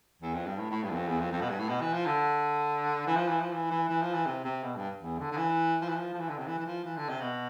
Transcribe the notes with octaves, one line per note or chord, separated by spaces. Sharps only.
E2
F2
G2
A2
A2
G2
E2
F2
E2
F2
F2
B2
G2
A2
B2
E3
F3
D3
E3
F3
E3
F3
E3
E3
E3
F3
E3
C3
C3
B2
G2
E2
D3
D3
E3
F3
E3
F3
F3
E3
D3
C3
E3
E3
F3
E3
D3
C3
B2